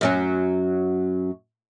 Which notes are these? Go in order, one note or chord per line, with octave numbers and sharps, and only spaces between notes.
F#2 F#3 C#4